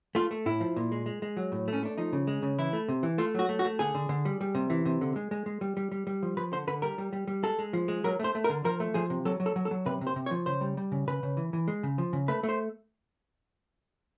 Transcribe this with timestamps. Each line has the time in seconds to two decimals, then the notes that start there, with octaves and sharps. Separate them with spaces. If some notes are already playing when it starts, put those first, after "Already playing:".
0.15 A3 F4
0.31 A3
0.46 A2 E4
0.60 F3
0.76 A#2
0.92 G#3
1.06 G#3
1.22 G#3
1.37 F#3
1.52 A2
1.68 A3
1.73 C#4
1.83 A3 D4
1.98 F3 D#4
2.13 C#3
2.27 G#3
2.42 C#3
2.59 E3 E4
2.73 A3
2.88 C3
3.03 E3
3.18 A3 F4
3.35 F#3 F#4
3.49 A3
3.59 F#4
3.65 A3
3.79 D3 G#4
3.95 D3
4.09 D3
4.25 G3
4.41 G3
4.55 C3
4.70 E3
4.85 C3
5.01 D3
5.16 G#3
5.31 G#3
5.46 G#3
5.61 G3
5.77 G3
5.92 G3
6.07 G3
6.23 F3
6.37 F3 B4
6.53 D3 C5
6.67 D3 B4
6.82 G3 A#4
6.98 G3
7.13 G3
7.28 G3
7.43 G#3 A4
7.59 G#3
7.73 F3
7.88 G#3
8.04 F#3 A#4
8.19 A3 C5
8.35 A3
8.44 A#4
8.49 D3
8.65 F3 A#4
8.80 A3
8.94 F3 G#4
9.10 C3
9.25 F#3 A4
9.40 F#3
9.46 A4
9.56 F#3
9.65 A4
9.71 F#3
9.86 C3 B4
10.01 C3
10.07 C5
10.16 C3
10.26 C#5
10.31 F3
10.46 C#3 C5
10.61 G3
10.77 G3
10.92 C#3
11.08 C#3 B4
11.23 C#3
11.37 E3
11.53 E3
11.68 G#3
11.83 C#3
11.98 F3
12.13 C#3
12.28 A3 B4
12.43 A3
12.49 C5